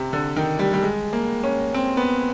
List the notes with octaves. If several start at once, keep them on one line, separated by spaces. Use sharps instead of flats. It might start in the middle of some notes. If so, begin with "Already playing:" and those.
Already playing: C3
D3
D#3
G3
G3
G#3
A#3
C#4
C4
B3